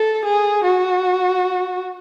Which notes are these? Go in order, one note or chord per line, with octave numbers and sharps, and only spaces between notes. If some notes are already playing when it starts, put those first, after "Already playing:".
Already playing: A4
G#4
F#4